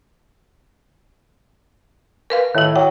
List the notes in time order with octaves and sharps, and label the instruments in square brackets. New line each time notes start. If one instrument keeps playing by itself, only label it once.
[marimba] A#4 B4 F5
[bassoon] A2 [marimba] D#3 E4
[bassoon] F#3 [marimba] G5